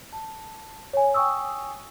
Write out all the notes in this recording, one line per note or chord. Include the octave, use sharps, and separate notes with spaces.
A5
C#5 G#5
G5 G#5 C#6 D#6 E6